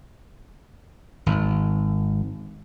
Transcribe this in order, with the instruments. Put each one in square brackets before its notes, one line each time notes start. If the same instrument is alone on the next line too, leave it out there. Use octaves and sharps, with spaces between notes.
[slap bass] G#1